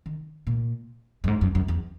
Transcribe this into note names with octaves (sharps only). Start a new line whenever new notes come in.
D#3
A#2
F#2
G#2
F#2
F#2
E2